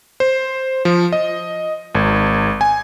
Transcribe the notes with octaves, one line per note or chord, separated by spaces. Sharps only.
C5
F3
D#5
G#1
G#5